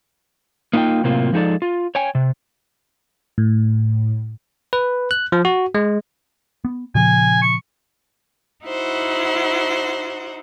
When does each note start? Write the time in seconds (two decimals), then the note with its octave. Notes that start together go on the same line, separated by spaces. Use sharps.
0.73 A#3 D#4 F4 B4 G5
1.04 A2 C3 F#3 A#3 C4 F4
1.33 F3 G#3 D#4 A4 D5
1.62 F4
1.95 C#5 G5 G#5
2.15 C3
3.38 A2
4.73 B4
5.11 F#6
5.32 F3
5.45 F#4
5.75 G#3
6.65 B3
6.95 A#2 C#3 F3 G#5
7.42 C#6
8.65 D#4 E4 F#4 C5 F#5